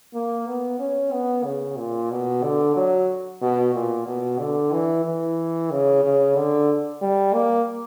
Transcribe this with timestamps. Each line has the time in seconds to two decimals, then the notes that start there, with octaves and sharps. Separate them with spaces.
0.14 A#3
0.47 B3
0.79 C#4
1.12 B3
1.45 C#3
1.78 A#2
2.11 B2
2.43 D3
2.76 F#3
3.41 B2
3.74 A#2
4.07 B2
4.39 D3
4.72 E3
5.05 E3
5.71 C#3
6.03 C#3
6.36 D3
7.02 G3
7.34 A#3